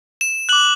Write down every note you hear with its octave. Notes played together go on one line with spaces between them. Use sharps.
E7
D6 F#6 F#7